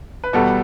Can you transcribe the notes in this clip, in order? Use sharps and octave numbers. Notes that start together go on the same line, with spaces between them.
B4
E2 B2 G3 B3 F#4 A4